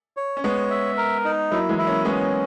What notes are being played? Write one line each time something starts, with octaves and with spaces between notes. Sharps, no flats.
C#5
C#4
G#3 B3 C#5
E5
A#4
D#4
F#3 A#3 E4
E3 G#3
E4
A#3 C#4
G#3 B3 C#4